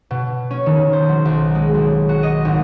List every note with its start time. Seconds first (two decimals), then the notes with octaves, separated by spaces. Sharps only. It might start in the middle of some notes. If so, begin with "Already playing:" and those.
0.11 B2
0.51 C#4
0.66 D#3
0.93 C5
1.09 F#3
1.25 B1
1.55 G#3
1.74 B1
2.09 F#4
2.23 D#5
2.45 G#1